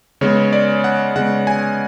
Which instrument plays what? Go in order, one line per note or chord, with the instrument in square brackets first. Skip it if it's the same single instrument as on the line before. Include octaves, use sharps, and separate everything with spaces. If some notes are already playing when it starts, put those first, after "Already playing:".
[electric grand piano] C#3 G#3 B3 C#5
D5
F#5
C#3 G#3 B3 F#5
G#5